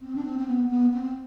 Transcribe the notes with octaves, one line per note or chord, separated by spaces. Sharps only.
C4
D4
C4
C4
B3
B3
C4